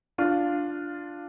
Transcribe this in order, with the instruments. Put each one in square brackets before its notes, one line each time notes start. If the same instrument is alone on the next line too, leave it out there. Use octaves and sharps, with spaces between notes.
[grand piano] D4 F4